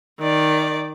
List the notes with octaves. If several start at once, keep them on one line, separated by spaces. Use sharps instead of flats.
D#3 D5